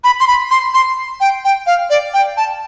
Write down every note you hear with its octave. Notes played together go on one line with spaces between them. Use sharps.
B5
C6
B5
C6
C6
G5
G5
F5
D5
G5
A5